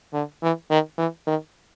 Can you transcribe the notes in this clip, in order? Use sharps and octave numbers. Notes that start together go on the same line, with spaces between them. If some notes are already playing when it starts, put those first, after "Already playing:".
D3
E3
D#3
E3
D#3